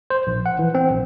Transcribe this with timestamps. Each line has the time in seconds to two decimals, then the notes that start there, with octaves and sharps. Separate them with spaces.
0.10 C5
0.27 A#1
0.46 F#5
0.59 E3
0.75 C4
0.91 A#1